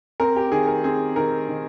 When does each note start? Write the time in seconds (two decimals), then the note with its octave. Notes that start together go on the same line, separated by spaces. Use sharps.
0.20 C4 A#4
0.36 G4
0.52 D#3 G#4
0.68 A#4
0.84 C4 G#4
1.16 D#3 A#4
1.49 D#3